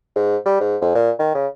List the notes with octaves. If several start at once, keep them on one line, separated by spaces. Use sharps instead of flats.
G#2
G3
G#2
F2
A#2
D#3
C#3